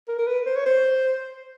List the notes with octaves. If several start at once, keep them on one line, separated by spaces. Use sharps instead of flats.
A#4
A#4
B4
C5
C#5
C5